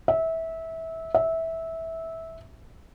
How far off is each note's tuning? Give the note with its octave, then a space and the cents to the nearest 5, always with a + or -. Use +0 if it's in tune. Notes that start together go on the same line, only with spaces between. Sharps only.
E5 -20
E5 -15